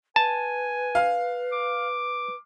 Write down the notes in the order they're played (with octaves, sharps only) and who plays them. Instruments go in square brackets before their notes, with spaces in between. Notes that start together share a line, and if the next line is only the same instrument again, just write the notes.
[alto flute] B4 [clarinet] G#5 [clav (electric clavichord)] A5
[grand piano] F5 F6
[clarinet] D6